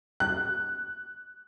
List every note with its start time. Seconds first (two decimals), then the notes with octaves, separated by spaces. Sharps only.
0.20 F#6